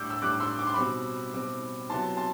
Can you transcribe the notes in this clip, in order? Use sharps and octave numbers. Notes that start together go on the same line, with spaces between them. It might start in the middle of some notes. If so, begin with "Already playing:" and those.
Already playing: A2 G3 D4 D6 E6 G6
E6
A2 G3 D4 D6 F#6
C6 E6
D6
C6
B2 G3 C4 B5 D6
B2 G3 C4
C3 F#3 B3 E4 A5 C6
A5 C6